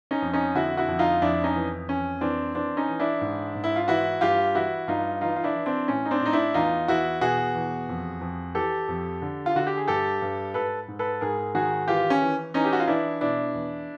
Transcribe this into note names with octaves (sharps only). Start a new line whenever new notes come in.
C#4 D#4
F2
C#4 D#4
D3 E4 F#4
E4 F#4
F2
D#4 F4
F2 D4 E4
C#4 D#4
E3
F2 C#4
E3 C4 D4
E3 C4 D4
C#4 D#4
E3
D4 E4
G#2
G#2
E4
F4
E3 E4 F#4
G2 F4 G4
E3 E4 F#4
G2 D#4 F4
E3 D#4 F4
F4
D4 E4
E3
C4 D4
A2 C#4
D#4
C4 D4
A2 D#4
D4 E4
E2 D#4 F4
E2 E4 F#4
B2 F#4 G#4
E2
F2
F2
E3 G4 A4
F2
D3
F4
D3 F#4
G4
G#4
G2 G4 A4
G2
G#2 A4 B4
G#2
A4 B4
G#2 G#4 A#4
D#3 F#4 G#4
E3 F4 G4
C#4
E3
E3 C#4 D#4
G4
F#4
F4
E3 D4 E4
B2 D4 E4
E2